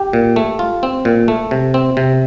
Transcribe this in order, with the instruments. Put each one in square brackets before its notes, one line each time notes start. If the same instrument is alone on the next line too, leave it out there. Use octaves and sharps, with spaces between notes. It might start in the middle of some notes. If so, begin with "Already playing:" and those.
Already playing: [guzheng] G4
[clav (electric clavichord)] A#2
A3
F4
C4
A#2
A3
C3
C4
C3